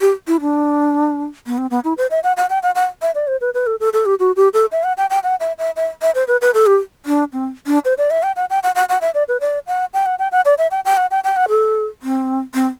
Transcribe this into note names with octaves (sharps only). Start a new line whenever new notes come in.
G4
E4
D4
B3
C4
B3
E4
C5
E5
F#5
F#5
G5
F#5
F#5
E5
D5
C5
B4
B4
A4
A4
A4
G4
F#4
G4
A4
E5
F#5
G5
G5
F#5
E5
E5
E5
E5
C5
B4
B4
A4
G4
D4
C4
D4
C5
D5
E5
G5
F#5
G5
F#5
F#5
F#5
E5
D5
B4
D5
F#5
G5
F#5
G5
F#5
D5
E5
G5
G5
F#5
G5
G5
F#5
A4
C4
C4